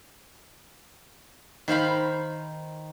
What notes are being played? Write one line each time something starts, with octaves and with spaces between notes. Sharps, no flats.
D#3 C5 F5 B5